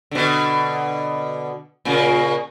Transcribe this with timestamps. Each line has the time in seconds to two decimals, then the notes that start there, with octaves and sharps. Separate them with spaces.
0.11 B2 D3
1.85 A#2 C#3 A#3